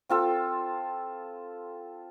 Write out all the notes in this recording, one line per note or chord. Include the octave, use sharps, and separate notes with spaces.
C4 F4 A4